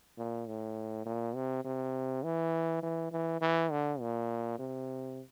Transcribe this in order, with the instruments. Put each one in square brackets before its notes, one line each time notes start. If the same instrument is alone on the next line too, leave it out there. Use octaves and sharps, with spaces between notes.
[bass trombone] A#2
A2
A#2
C3
C3
E3
E3
E3
E3
D3
A#2
C3